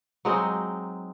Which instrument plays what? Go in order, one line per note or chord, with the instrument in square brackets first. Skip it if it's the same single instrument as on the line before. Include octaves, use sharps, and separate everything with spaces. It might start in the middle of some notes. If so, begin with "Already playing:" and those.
[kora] F#3 G#3 C4 D#4